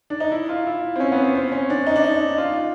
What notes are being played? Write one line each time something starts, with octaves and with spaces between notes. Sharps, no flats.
D4
D#4
E4
F4
E4
C4
C#4
B3
C4
C4
C#4
D4
D#4
D4
D#4
F4